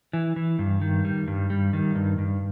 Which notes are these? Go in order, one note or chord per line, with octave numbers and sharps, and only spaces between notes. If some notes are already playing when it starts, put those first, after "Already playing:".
E3
E3
G2
D#3
G3
G2
G3
D#3
G2
G2